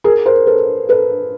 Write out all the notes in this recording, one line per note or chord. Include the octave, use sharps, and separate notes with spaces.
G#4 A#4
A#4 C5
A4 B4
A4 B4